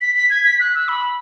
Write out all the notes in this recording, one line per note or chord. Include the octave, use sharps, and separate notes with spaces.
B6
B6
G#6
B6
F#6
E6
B5